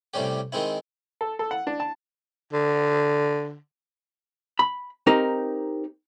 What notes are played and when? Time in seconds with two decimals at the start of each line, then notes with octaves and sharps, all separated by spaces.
0.14 A2 C3 G3 C#4 G4
0.52 D#3 G#3 C4 E4
1.21 A4
1.39 A4
1.51 F#5
1.67 D4
1.80 A5
2.53 D3
4.59 B5
5.07 C4 D#4 G4 A#4